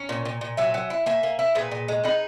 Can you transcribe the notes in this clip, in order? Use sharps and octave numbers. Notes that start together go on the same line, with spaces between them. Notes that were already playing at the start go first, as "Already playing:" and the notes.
Already playing: C#4 A#5
A#2
A#2
A#2
F#3 E5 G#5
F#3
E4
A#3 E5 G#5
A#3
E4
A#2 G#4 B4
A#2
G#3
D#4 G#4 B4